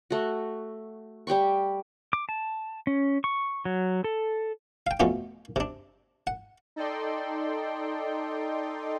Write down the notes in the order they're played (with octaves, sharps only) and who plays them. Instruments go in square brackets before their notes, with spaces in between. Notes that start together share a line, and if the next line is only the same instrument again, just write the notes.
[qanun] A3 F#4
G3 G4 G5 C#6
[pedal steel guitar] D6
A5
C#4
C#6
F#3
A4
[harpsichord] F5 G5
F2 B2 A3 B3 C#4 F4
C3 D4
F#5
[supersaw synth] D#4 A4 D5 D#5 G5 C6